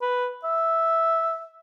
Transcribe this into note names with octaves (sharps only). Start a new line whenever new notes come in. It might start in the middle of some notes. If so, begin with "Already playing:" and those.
B4
E5